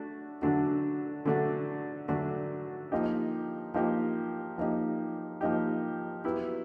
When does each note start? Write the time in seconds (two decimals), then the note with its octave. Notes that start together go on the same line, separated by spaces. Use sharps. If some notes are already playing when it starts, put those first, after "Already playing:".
Already playing: A3 D4 F#4
0.42 D3 F#3 A3 D4 F#4
1.25 D3 F#3 A3 D4 F#4
2.08 D3 F#3 A3 D4 F#4
2.92 F3 A#3 D#4 G4
3.74 F3 A#3 D#4 G4
4.58 F3 A#3 D#4 G4
5.41 F3 A#3 D#4 G4
6.25 F#3 B3 E4 G4